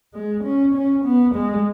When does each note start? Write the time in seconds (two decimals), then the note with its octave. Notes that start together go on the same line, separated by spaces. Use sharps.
0.14 G#3
0.44 C#4
0.74 C#4
1.05 B3
1.35 G#3